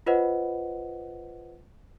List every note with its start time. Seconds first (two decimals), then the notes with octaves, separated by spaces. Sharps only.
0.06 F4 B4 C5 D#5 F#5